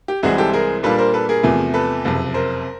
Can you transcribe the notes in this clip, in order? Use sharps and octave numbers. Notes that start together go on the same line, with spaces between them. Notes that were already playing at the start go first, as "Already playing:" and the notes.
G4
C2 C3 E3 G#3 C4 F#4 G#4
G4 A4
G#4 A#4
A#2 G3 A#3 D4 F4 A4 B4
A#4 C5
A4 B4
G#4 A#4
E2 C3 F3 A3
A4 B4
F#1 F2 C3
A#4 C5